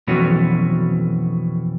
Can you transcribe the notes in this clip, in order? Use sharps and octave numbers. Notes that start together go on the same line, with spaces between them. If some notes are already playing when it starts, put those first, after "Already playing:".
F2 B2 E3 F#3 A3 C#4